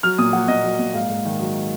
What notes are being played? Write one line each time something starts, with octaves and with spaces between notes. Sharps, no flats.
F#3 F6
A#2 D#6
F#3 F#5
A#2 D#5
F#3
A#2
G#2 F5
G#2
D#3
F#3